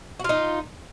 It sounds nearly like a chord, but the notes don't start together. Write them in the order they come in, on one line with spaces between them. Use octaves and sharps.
F#4 F4 D#4